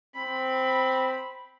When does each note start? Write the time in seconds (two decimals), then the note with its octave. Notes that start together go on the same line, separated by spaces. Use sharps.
0.16 C4 B5